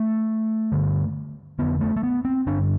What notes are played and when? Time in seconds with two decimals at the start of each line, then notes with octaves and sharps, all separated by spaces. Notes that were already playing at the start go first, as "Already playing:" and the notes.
Already playing: A3
0.72 G2 D3
1.59 F2 D3 B3
1.81 A3
1.97 A3
2.03 B3
2.25 C4
2.47 G2 D3 D4